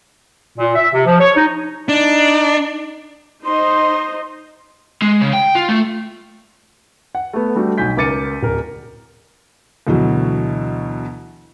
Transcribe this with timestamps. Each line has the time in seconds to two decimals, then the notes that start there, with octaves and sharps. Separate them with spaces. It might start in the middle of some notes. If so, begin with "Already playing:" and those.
0.58 A#2
0.76 E5
0.93 C3
1.06 F3
1.20 C#5
1.36 D#4
1.89 D4 D#4
3.45 D#4 C5 D#5 C6
5.02 G#3
5.21 C#3
5.33 G5
5.55 F4
5.69 A3
7.15 F#5
7.33 A3 B3
7.55 G3 A3 D4 F#4 G4
7.78 B1 G#5 G6 B6
7.97 C#2 A#4 D6 A6 C#7 D#7
8.43 D1 A#4
9.87 D2 B2 E3 F#3